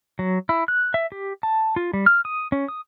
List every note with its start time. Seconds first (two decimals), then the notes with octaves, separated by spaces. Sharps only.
0.19 F#3
0.49 E4
0.68 F#6
0.94 E5
1.12 G4
1.43 A5
1.76 F4
1.94 G3
2.06 F6
2.25 D#6
2.52 C#4
2.68 D#6